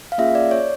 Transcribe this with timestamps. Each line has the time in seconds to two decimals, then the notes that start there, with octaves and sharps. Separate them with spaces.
0.12 F5
0.18 A#3 C#4 F4 G#4 E5
0.35 D5
0.51 C#5